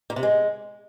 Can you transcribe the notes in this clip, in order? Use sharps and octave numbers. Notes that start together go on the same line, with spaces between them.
A#2
C3
G#3